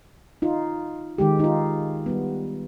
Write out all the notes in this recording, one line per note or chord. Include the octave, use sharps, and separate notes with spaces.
D#4 F4
D#3 G#3 G4
D#4 F4
G3 B3